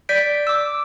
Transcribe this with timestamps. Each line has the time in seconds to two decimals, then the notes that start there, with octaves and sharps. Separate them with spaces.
0.09 D5 G6 B6 D7
0.47 D6 E6